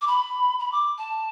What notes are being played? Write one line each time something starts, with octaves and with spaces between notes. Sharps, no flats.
D6
B5
B5
D6
A5